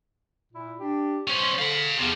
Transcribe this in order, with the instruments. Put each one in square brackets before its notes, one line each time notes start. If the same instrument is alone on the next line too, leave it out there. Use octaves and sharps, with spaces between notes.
[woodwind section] A#2 E4
D4 G4
[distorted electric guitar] B1 C#4 [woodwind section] C5
[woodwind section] D3 [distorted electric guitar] F5 B5
[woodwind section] E2 [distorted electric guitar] C3 F3